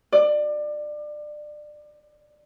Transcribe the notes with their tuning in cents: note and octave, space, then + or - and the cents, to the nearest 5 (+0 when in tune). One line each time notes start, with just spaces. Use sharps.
D5 +25